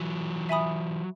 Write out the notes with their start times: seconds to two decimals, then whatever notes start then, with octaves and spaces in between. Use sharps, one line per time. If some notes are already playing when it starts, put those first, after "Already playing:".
Already playing: E3 F#3
0.49 E5 G#5 B5 D#6